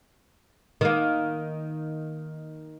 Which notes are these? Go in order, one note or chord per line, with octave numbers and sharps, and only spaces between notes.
D#3 A#3